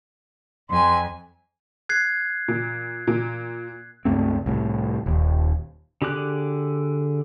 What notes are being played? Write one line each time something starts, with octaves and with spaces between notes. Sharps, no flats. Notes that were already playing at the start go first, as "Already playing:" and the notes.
F2 G#5 C6
F#6 G#6 C7
A#2
A#2
C#2 G2 A3 C4
C2 A2
D#1 D#2
D3 G4 G#4 D6 F#6